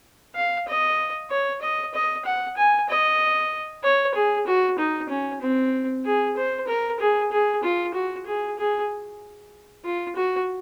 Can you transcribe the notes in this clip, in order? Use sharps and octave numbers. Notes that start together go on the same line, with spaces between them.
F5
D#5
C#5
D#5
D#5
F#5
G#5
D#5
C#5
G#4
F#4
D#4
C#4
C4
G#4
C5
A#4
G#4
G#4
F4
F#4
G#4
G#4
F4
F#4